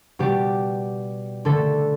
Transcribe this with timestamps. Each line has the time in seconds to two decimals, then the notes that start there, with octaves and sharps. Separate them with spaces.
0.19 B2 G3 G4
1.45 D3 A3 A4